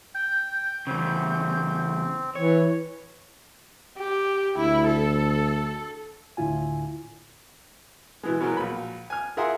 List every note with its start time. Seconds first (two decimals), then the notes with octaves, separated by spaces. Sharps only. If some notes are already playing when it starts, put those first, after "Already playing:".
0.15 G5 G6
0.87 E2 C#3 C4
2.35 E3 C#5
3.98 G4
4.57 D2 E4
4.87 A4
6.37 D2 A2 D3 E4 F4 G#5
8.23 B2 E3 G#3
8.40 B2 F#3 G#3 B3 A#4 B4
8.57 A#1 B5
9.10 G#5 F6
9.37 F4 G#4 A#4 E5 F#5 C6